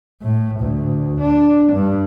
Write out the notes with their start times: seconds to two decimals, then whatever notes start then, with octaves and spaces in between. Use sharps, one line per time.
0.22 A2
0.60 D2
1.20 D4
1.72 G2